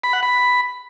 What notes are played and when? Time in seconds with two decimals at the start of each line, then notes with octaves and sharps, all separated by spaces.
0.04 B5
0.13 F#5
0.23 B5